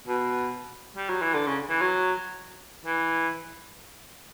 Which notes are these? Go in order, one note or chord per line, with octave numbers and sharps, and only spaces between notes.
B2
G3
F#3
E3
D3
C#3
E3
F#3
E3